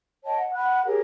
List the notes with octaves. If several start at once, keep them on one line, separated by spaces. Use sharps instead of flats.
C#5 D#5 G5 A5
F#5
F#5 B5 F#6
G4 G#4 A#4 C#5